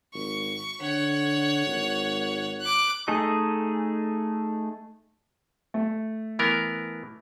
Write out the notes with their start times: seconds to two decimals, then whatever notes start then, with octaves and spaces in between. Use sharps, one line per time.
0.14 G#1 C#6
0.81 D3 C#5 F#5
1.67 G#1
2.61 D6 F#6
3.08 A3 D#4 G#4 A4 D#5
5.74 A3
6.39 E3 B3 A#4